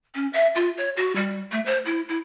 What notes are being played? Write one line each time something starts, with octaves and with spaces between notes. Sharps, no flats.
C#4
E5
F4
C#5
F#4
G3
A3
C5
E4
E4